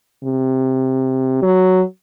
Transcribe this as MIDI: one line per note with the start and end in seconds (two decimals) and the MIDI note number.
0.24 1.42 48
1.42 1.81 54